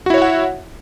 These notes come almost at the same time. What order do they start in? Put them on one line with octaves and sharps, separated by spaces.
F#4 E4 C#5 E5 F#5